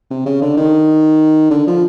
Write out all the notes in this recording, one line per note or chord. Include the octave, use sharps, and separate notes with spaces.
C3
C#3
D3
D#3
D3
F3